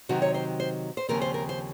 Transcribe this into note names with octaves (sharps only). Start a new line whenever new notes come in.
C3 D#3 F#3 C4 F#4
C#5
C5
C5
C5
D#2 C#3 F3 C4 A#4
C5
A#4
C5